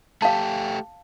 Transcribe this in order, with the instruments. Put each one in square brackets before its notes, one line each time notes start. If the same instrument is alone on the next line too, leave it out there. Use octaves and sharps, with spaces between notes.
[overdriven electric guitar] A3 G4 [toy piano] F5 A5